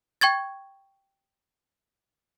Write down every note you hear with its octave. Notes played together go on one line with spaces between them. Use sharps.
G5 C#6 G#6 A6